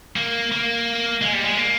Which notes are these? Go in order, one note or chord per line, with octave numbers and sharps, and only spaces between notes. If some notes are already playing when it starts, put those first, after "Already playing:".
A#3
A#3
G#3
G3
G#3
A#3